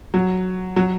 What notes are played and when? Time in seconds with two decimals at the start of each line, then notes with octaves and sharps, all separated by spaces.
0.14 F#3
0.76 F#3